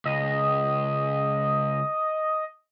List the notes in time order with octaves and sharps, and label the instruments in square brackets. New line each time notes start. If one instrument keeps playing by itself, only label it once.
[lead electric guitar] C#2 [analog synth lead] D#5